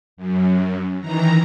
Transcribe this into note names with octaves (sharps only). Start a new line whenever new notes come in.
F#2
D#3 E3 A#5